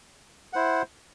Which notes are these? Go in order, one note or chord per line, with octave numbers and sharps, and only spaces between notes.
E4 C5 F#5